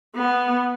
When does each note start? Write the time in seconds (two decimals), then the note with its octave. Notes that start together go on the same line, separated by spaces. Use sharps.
0.15 B3